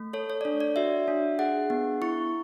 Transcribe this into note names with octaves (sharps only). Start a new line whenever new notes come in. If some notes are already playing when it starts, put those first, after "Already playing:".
Already playing: A3
A4 C#5
C#5
D5
D4 C#5
D5
F#4 E5
D4
G#4 F#5
B3
E4 C#6